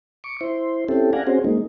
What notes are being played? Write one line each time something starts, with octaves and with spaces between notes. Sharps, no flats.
C#6 D6
E4 C5
C4 C#4 E4 G4 A4
D5 F5 F#5 G#5 A#5
C4 C#4 F#4 G#4 C5
G#3 A#3 D#4